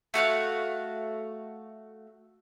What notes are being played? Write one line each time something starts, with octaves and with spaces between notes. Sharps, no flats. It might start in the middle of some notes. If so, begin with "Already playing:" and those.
A3 F#4 F5 F#6